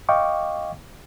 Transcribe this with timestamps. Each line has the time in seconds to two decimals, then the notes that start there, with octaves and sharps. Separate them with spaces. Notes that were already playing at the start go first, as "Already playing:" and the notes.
0.09 D#5 F5 G5 C#6 D6